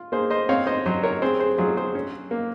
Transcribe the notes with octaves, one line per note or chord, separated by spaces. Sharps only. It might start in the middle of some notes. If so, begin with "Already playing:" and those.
Already playing: F4
A#3 G#4 C5
C5 D#5
C4 C#5 F5
C5 D#5
F#3 C5 D#5
A#4 C#5
C4 G#4 C5
G#4 C5
F#3 F4 G#4
G#4 C5
C#4
A#3